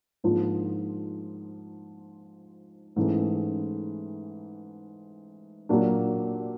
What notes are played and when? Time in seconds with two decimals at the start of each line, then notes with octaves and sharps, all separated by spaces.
0.24 G#2 F3 A#3 D4 F4
2.96 G#2 E3 A3 C#4
5.69 A#2 F#3 A#3 D4 G4